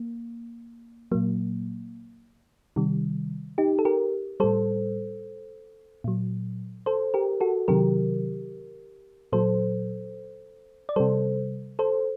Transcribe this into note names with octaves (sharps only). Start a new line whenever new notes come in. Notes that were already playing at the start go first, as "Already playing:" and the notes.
Already playing: A#3
A#2 F#3 A#3
C3 D#3 G3
D#4 G4
A4
G4 A#4
A2 G3 A4 C5
A#2 F#3
A4 C5
G4 A#4
F#4 A4
C3 D#3 F#3 G4 A#4
A#2 F#3 A4 C5
D5
C3 G3 A4 C5
A4 C5